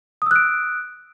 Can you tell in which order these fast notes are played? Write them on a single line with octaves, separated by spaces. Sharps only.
D#6 E6 F#6 D7